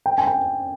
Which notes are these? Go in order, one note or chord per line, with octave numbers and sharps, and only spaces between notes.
G5
G#5
G5